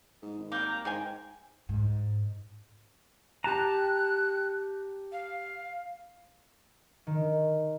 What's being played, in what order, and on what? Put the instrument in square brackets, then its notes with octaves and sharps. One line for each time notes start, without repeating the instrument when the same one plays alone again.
[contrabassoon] G#2
G#1
[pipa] G3 A#3 [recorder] G6
[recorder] A#5
[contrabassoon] G#2 [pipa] D#3 C5 G#5 [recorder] G5
[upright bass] G#2
[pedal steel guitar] G4 A5 A#5 [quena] F#6
[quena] F5
[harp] D#3